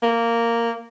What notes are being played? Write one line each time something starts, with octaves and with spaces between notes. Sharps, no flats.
A#3